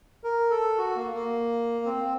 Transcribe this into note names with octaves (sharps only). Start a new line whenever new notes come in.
A#4
A4
F#4
A#3
A#3
C4